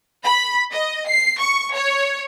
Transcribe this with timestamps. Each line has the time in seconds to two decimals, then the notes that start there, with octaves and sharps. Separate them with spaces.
0.25 B5
0.73 D#5
1.07 C7
1.39 C#6
1.74 C#5